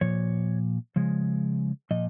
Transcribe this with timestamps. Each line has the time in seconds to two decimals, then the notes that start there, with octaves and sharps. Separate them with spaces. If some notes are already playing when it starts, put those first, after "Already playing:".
0.01 A#2 F3 C#5
0.96 C#3 F3 G#3
1.91 A#2 F3 D#5